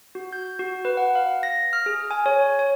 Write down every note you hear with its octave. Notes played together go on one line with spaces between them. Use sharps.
F#4
G6
F#4
B4
F#5
F5
A#6
F6
G#4
G#5
C#5
C#5